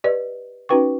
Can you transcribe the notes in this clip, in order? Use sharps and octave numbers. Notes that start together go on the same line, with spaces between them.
G4 B4 D5 D#5
C#4 D#4 F#4 B4 G5 C#6